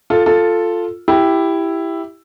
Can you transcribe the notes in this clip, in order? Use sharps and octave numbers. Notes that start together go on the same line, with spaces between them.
F4 A4
F4 A4
E4 G4